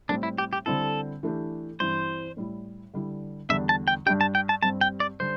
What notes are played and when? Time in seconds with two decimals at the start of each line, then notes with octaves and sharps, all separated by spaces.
0.09 A2 G3 C4 D4
0.23 E4
0.38 G4
0.53 G4
0.66 D3 G3 C4 E4 A4
1.23 E3 A3 D4 G4
1.80 G2 E3 C4 C5
2.37 A2 G3 E4
2.94 D3 G3 E4
3.49 E2 D3 G3 D4 E5
3.69 A5
3.88 G5
4.06 G2 G3 D4 G4 G5
4.21 A5
4.35 G5
4.49 A5
4.62 G2 G3 C4 A5
4.81 G5
5.00 D5
5.20 D3 G3 D4 C5